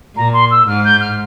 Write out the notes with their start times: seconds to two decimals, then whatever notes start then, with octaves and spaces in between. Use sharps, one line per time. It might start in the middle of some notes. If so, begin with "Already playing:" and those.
0.16 A#2 A#5
0.33 C6
0.51 E6
0.67 G#2 F6
0.85 G6
1.01 F6